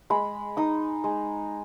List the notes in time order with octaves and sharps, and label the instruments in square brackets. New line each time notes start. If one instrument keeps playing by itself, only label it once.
[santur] G#3 B5
D#4 D#6
G#3